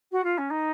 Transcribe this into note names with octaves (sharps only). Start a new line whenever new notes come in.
F#4
F4
C#4
D#4